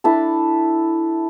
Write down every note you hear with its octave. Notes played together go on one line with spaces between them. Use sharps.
D4 E4 A4